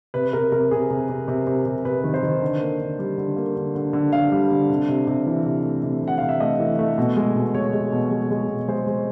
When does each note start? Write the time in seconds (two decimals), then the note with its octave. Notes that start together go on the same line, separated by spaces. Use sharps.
0.14 C3 B4
0.33 C3 A#4
0.52 C3 A#4
0.71 C3 G#4
0.90 C3
1.09 C3
1.28 C3
1.47 C3
1.66 C3
1.85 C3 B4
2.04 D#3
2.14 C5
2.23 D#3
2.42 D3
2.61 A#3
2.80 D3
2.99 G3
3.18 D3
3.36 A#3
3.56 D3
3.75 D3
3.93 D3
4.12 D3 F5
4.32 G3
4.50 D3
4.69 C3
4.89 C3
5.07 C3
5.26 E3
5.46 C3
5.64 A3
5.83 C3
6.03 C3 F#5
6.18 C3 F5
6.29 E5
6.40 A3 D#5
6.59 E3
6.79 A3
6.98 B2
7.16 G#3
7.35 B2
7.54 G#3 C#5
7.73 G#3
7.92 B2
8.11 G#3
8.31 G#3
8.49 B2
8.68 G#3 C5
8.87 G#3